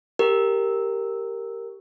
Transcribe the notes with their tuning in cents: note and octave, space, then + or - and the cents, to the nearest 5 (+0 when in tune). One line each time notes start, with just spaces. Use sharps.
G4 +0 A#4 -10